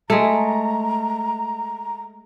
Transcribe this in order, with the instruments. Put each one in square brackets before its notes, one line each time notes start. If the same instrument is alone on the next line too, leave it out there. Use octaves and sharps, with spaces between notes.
[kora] G#3 A3 [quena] A#5